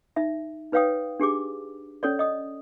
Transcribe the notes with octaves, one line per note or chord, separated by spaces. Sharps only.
D#4 E5
D#4 B4 C#5 F5 G5 D#6
D4 G4 G#4 D6
C#4 A4 C#5 D5
D#5 D#6